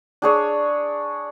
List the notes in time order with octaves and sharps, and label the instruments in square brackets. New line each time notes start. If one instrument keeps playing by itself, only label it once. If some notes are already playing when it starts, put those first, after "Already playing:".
[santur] D4 G#4 C#5